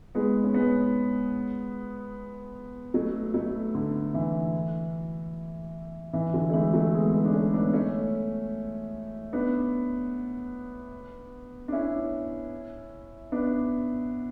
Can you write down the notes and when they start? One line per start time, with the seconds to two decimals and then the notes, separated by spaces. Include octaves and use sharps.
0.15 G#3 B3
0.44 C#4
0.54 G#3 B3
2.94 F#3 A3
3.34 F#3 A3
3.74 D3
4.14 E3
6.13 E3
6.33 D3 F#3
6.49 A3
6.53 E3 G#3
6.73 F#3 A3
6.94 G#3 B3
7.14 G#3 B3
7.25 D4
7.33 A3 C#4
7.53 B3 D4
7.73 A3 C#4
9.33 B3 D4
11.68 D4
11.72 C#4 E4
13.32 B3 D4